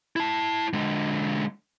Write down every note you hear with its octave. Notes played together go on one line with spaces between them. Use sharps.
E4 A5
D3 G#3